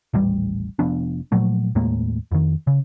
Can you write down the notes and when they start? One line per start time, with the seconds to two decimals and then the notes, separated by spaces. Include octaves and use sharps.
0.14 D#1 A1 G3
0.79 F1 F3 B3 D4
1.32 A#2 F3 F#3 A3
1.75 D#2 A2 G#3 A#3
2.32 F2 D#3
2.67 C#3